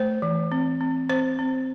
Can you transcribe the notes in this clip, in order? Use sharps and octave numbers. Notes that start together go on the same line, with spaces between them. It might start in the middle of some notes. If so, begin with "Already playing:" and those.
Already playing: A3 C5
E3
C4
C4
C4 C5
C4